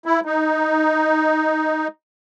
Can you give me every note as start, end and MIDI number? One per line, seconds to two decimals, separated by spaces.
0.06 0.20 64
0.26 1.88 63